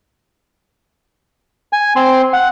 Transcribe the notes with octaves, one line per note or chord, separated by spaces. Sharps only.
G#5
C4 C6
F#5